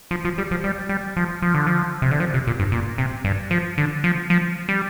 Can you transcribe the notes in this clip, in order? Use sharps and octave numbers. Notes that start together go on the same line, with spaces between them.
F3
F3
G3
F3
G3
G3
F3
F3
D3
F3
C3
D3
F3
C3
A#2
G2
A#2
C3
G2
F3
D3
F3
F3
G3